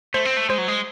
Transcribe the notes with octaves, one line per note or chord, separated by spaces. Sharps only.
A3 C5
C4
A3
G#3 C5
F#3
G#3